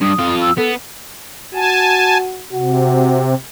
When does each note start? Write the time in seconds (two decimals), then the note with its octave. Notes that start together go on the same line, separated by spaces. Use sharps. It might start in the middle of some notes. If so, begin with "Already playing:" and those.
0.01 G2 D#6
0.19 F2 F4
0.41 E6
0.58 B3 A4
1.54 F#4 G#5 A5
2.53 C3 F#4